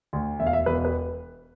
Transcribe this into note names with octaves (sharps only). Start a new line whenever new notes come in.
D2
E1 E5
F5
E5
E1 B4
B4